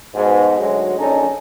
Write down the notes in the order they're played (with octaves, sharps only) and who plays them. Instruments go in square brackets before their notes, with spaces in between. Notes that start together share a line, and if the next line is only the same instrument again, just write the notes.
[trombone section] G#2 B2
D2 F#3 G#3
A#1 C#4 D#4 A4